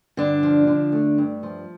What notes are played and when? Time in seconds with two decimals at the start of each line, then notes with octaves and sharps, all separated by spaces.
0.17 G2 D3 D4
0.43 F3
0.67 D3
0.92 A3
1.18 G2
1.43 F3